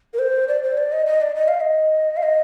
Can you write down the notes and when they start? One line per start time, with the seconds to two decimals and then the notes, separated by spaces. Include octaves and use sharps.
0.14 A#4
0.19 C5
0.48 D5
0.63 C5
0.78 D5
0.92 D#5
1.06 D#5
1.21 D5
1.35 D#5
1.48 F5
1.61 D#5
2.17 F5
2.23 D#5